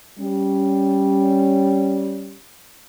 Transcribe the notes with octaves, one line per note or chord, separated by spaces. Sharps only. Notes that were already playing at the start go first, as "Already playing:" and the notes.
G3 C#4